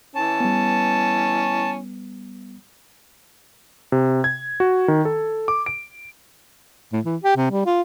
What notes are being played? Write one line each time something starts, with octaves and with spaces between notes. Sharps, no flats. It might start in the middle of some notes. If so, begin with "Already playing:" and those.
E3 C#4 A5
G3 B3
C3
G#6
F#4
D#3
A4
D6
D7
A2
E3
G4
C3
G3
F4